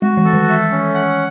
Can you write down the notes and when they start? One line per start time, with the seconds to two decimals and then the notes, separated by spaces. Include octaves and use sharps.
0.02 G#3 F#4
0.17 E3
0.25 A4
0.33 D#3
0.49 A3
0.71 C#4
0.94 F#5